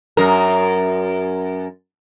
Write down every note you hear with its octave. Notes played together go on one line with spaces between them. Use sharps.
F#2 A#4